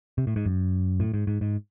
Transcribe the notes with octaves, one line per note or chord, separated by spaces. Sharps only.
C3
A2
G#2
F#2
A2
G#2
G#2
G#2